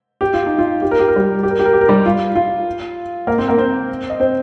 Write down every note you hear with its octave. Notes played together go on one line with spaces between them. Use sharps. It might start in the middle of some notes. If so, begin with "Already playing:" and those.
G4
F4
D#4
F4
G4
A#4
G4
A#4
G3 G4
G4
A#4
G4
A#4
G4
A#4
G3 G4
F4
F4
A#3 A#4
C4 C5
A#3 A#4
C4 C5
D#5
C4 C5